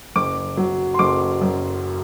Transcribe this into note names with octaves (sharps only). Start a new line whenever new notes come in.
F#1 D6
F#3
C6
F#1 D6
F#2